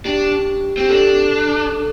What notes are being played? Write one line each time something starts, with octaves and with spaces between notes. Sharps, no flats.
D4 G4
C4 G4
D4 A4
A4